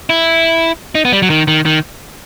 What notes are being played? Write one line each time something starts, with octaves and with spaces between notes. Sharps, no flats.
E4
D#4
B3
G3
F#3
D#3
D#3
D#3